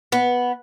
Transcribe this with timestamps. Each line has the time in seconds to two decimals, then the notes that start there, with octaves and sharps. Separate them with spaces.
0.12 B3